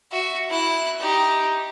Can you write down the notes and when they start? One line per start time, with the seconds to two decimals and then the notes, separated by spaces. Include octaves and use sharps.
0.12 F#4 E5
0.50 E4 F#6
1.00 D#4 G4